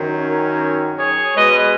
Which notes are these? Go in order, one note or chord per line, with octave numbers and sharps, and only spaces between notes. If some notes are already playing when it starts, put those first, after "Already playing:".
Already playing: F#2 D#3 F#3
C#4
G#4 C#5
B2 G#3 B4 D#5